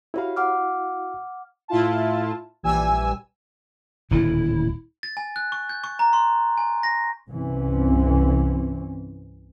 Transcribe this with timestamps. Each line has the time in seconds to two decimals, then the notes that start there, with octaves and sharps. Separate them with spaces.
0.14 E4 F#4 G4 C#5 F5 B5
0.36 F#5 D6 F6
1.68 A2 E4 F4 A5
2.63 A#1 E3 G3 G#5 E6
4.11 D#1 D2 A2 E4
5.03 A6
5.17 G#5
5.36 F#6
5.52 C#6
5.69 G6
5.84 C#6
5.99 A#5
6.13 C6
6.57 G#5
6.83 A#6
7.30 C2 G2 E3 C4 C#4